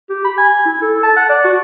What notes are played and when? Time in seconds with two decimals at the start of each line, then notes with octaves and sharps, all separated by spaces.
0.10 G4
0.24 B5
0.38 G#5
0.65 E4
0.82 A4
1.03 A5
1.16 F#5
1.29 D5
1.44 F#4